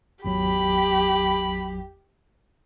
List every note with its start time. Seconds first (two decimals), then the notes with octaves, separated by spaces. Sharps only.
0.25 G#1 E2 F#3 G4 B5